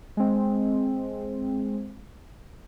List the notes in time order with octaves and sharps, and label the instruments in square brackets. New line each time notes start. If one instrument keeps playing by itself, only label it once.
[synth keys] G#3 C4